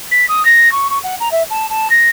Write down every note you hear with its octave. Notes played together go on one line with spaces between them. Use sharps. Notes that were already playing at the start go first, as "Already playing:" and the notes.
B6
D#6
A#6
C#6
C#6
F#5
A#5
E5
A5
A5
A#6